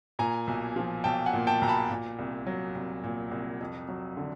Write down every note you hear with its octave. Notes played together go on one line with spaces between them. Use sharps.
A#2 G#5 A#5
B1
F3
B1 G5 A5
F#5 G#5
A#2
G5 A5
B1 A#5
A5 B5
A#2
C2
F#3
C2
A#2
C2
F2
F#3
D3